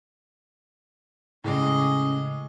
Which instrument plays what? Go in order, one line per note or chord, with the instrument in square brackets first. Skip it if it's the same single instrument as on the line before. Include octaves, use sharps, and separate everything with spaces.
[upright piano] A2 G#3 D6 [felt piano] C#3 [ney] C#4 [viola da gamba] G#4 D#5